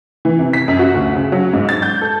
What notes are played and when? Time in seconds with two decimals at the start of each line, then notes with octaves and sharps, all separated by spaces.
0.25 E3
0.39 C3
0.53 B6
0.68 F#2
0.79 F#4
0.94 D2
1.16 C#3
1.32 F#3
1.53 G#2
1.69 A6
1.82 G6
2.01 A4